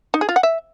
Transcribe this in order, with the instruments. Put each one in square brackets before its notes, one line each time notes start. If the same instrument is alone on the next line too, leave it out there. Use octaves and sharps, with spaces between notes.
[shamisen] D#4
G#4
F4
F#5
E5